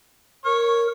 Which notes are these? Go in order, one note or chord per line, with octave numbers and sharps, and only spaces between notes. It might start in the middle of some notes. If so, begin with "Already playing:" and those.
A#4 C#5